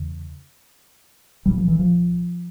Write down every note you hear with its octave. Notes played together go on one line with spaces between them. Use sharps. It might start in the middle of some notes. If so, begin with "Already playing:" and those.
Already playing: E2 C#3
C2 A#2 G3
F3
E3
F3